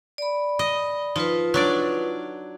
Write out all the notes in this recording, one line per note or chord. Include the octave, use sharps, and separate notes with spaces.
D5 B5
D#5
F3 D#4 F4 B4
F#3 D4 D5